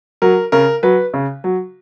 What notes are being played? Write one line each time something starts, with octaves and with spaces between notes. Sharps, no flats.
F#3 A#4
C#3 A#4
F#3 B4
C#3
F#3